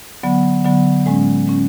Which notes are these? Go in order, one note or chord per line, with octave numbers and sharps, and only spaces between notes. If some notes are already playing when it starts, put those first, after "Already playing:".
D3 F#3 B3
D3 F#3 B3
A2 G#3 C#4
A2 G#3 C#4